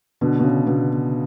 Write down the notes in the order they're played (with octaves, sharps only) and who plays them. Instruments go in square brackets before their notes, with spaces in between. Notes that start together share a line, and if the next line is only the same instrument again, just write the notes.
[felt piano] B2 D3
B2
C#3
B2 D3